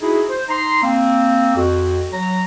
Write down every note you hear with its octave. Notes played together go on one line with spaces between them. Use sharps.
D#4 E4 F#4 G#4
C5
D#4 A#5 C6
A#3 C4
F2 F#4
F#3 A#5